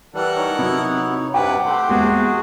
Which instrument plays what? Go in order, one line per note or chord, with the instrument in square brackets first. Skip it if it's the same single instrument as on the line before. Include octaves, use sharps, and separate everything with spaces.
[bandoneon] E3 G3 [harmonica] A4 A#4 F#5
[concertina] D#4 C#5
[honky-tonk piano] C3 F#3 [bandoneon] B3 E4
[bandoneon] G2 C3 [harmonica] D4 B4 [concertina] F#5 D6 [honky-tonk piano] G5
[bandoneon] A3 [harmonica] G4 C6
[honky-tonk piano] E2 G#3 A#3 [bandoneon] C3 F#4 G#4